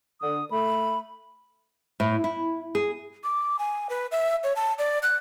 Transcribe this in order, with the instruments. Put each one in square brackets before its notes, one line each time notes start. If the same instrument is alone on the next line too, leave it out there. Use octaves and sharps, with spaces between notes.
[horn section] D3 [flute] D#6
[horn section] A3 [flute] B5
[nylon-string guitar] A2
E4
G#4
[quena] D6
G#5
B4
E5
C#5
A5
D5
F#6